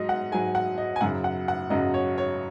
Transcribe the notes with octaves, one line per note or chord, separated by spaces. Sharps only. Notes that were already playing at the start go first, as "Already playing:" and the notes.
Already playing: G#2 F#3 D#5
F#5
G#2 F#3 G#5
F#5
D#5
G#5
F#2 C#3 F#3 F#5
F#5
F#5
F#2 C#3 F#3 D#5
C#5
C#5